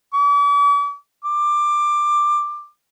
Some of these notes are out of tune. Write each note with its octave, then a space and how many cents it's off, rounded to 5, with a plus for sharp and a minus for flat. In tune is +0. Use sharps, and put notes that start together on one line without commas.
D6 -45
D6 +15